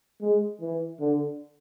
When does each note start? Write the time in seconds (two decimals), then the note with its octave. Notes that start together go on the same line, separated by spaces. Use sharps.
0.22 G#3
0.61 E3
1.00 D3